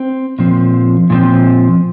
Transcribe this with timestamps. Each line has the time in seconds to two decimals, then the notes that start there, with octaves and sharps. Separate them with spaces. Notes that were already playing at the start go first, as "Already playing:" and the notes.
Already playing: C4
0.39 A#2 F3 C4
1.10 A#2 F3 C4